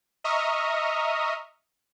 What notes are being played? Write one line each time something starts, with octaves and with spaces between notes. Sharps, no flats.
D#5 E5 A#5 C#6 D#6 F6